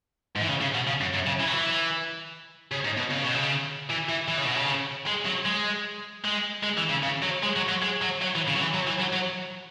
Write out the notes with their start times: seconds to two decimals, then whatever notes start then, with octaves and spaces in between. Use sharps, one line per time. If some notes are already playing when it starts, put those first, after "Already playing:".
0.36 G#2
0.41 E3
0.49 C#3
0.61 C#3
0.75 B2
0.87 C#3
1.01 F#2
1.14 F#2
1.26 C#3
1.40 E3
1.47 F#3
1.53 E3
2.71 C#3
2.84 G#2
2.97 B2
3.10 C#3
3.23 B2
3.35 C#3
3.90 E3
4.09 E3
4.28 E3
4.37 C#3
4.46 B2
4.56 C#3
5.07 G#3
5.26 F#3
5.46 G#3
6.25 G#3
6.64 G#3
6.78 E3
6.90 C#3
7.03 C#3
7.22 F#3
7.43 G#3
7.56 F#3
7.69 F#3
7.82 G#3
8.02 F#3
8.22 F#3
8.35 E3
8.47 C#3
8.55 F#3
8.61 E3
8.74 F#3
8.87 E3
9.00 F#3
9.13 F#3